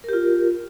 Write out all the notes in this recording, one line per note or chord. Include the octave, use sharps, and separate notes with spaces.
F4 G4 A#4